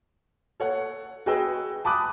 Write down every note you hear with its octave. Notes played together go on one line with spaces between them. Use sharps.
A4 C#5 F#5
F#4 G#4 B4 D#5 G5 E6
G#5 A5 B5 D6 D#6 F#6